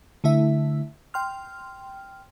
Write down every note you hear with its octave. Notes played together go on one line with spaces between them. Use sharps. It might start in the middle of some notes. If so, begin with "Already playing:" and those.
D3 A3 E4 E5
G5 C6 F6